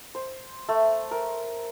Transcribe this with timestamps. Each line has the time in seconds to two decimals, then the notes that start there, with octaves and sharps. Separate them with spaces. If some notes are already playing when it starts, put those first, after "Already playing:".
0.15 C5
0.69 A3
1.11 A#4